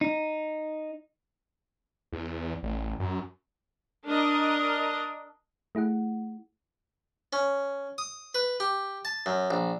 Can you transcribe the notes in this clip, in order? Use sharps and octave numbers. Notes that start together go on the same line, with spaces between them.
D#4
E2
A1
F#2
D4 A#4 D#5
A3 E4 G#4 F#5
C#4
D#6
B4
G4
A5
F#2
A#1